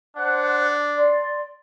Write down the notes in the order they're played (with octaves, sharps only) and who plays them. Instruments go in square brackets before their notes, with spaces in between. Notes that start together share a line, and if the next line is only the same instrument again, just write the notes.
[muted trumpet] D4 [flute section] C5 F#5 F#6
[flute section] D5 C6